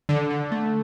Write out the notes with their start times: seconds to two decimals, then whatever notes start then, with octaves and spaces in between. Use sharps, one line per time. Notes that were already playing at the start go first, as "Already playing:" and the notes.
0.09 D3
0.31 D3
0.52 A3